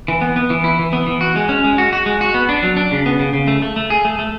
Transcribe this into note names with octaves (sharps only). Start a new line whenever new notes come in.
E3
B3
B3
E3
E4
E3
B3
E3
F#4
G#3
C#4
G#3
F#4
F#4
G#3
F#4
B3
D4
F#3
D4
C#3
B3
C#3
C#3
A3
A3
A3
G#4
A3
A3